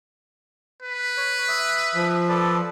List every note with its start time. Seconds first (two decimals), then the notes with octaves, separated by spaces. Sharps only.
0.82 B4
1.17 C#5
1.48 E5 D#6
1.95 F3
2.29 A4 B4 D5